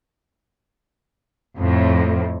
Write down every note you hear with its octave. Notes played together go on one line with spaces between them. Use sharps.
F2 A2